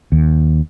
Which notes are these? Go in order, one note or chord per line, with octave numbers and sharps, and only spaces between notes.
D#2